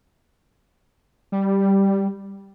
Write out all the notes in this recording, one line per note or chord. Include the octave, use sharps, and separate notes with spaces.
G3